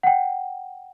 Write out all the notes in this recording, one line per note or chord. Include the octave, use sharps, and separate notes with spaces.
F#5 G5